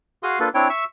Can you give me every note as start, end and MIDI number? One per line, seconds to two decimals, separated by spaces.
0.23 0.39 66
0.23 0.39 68
0.23 0.39 77
0.23 0.39 84
0.23 0.39 87
0.40 0.49 58
0.40 0.49 62
0.40 0.49 65
0.40 0.49 69
0.40 0.49 71
0.55 0.68 60
0.55 0.68 62
0.55 0.68 64
0.55 0.68 73
0.55 0.68 79
0.69 0.85 76
0.69 0.85 85
0.69 0.85 88